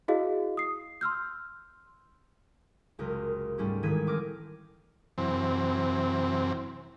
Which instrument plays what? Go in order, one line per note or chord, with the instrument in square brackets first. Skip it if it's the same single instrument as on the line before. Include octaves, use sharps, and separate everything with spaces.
[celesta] E4 F#4 G#4 D#5 F5
D#6 C7
C6 E6 F6 G6
[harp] F#1 C#2 C3 A#4
G#2 G3 A3 C#4 F4 G4
A1 D#3 G#3 G#6 B6 D#7
C4 D6 F6 A#6
[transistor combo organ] F#2 C3 E3 C4